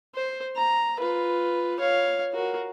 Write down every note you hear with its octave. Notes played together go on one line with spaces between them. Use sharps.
C5
A#5
F4 B4
C#5 F5
F#4 A#4